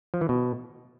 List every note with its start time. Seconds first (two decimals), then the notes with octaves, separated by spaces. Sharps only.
0.14 F3
0.21 E3
0.29 B2